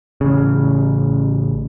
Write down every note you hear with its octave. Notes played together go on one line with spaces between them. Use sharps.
A1 C#3